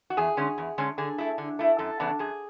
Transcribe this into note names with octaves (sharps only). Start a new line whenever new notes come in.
F#4
E2 G#4
D3 G#3 C#4
E2
D3 G#3 C#4
D3 G#4
A3 E4
D3
A3 E4
F#2 A4
C#3 E3 B3 D4
F#2 G#4